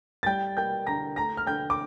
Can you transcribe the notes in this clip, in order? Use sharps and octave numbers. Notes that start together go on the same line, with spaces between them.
A6
G3 G5 G6
A#3 G5 G6
D3 A#5 A#6
A3 A#5 A#6
F6
D3 G5 G6
D6